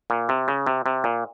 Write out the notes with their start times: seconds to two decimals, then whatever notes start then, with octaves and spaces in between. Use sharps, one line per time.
0.10 A#2
0.29 C3
0.48 C#3
0.67 C3
0.86 C3
1.04 A#2